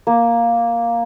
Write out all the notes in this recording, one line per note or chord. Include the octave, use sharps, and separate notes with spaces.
A#3